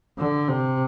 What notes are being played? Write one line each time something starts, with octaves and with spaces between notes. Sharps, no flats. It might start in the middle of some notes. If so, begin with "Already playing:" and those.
D3
C3